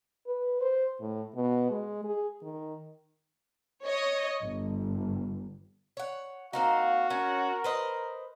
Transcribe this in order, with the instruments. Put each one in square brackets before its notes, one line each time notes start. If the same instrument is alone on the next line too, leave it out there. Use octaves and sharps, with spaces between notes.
[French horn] B4
C5
A2
B2
G#3
G#4
D#3
[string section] C#5 D#5
G1
[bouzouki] C#5 F#5
[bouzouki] A#3 C4 D#4 [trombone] F#4 [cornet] F5
[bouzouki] C#4 [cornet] A#4
[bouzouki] B4 C5 D#5